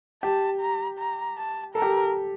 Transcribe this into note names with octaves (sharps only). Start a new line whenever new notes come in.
G4 A5
A#5
A#5
A5
A4 A#4
G4
A4